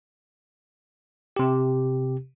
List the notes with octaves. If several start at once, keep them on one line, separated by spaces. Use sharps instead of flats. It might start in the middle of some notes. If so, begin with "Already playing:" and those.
C3 G4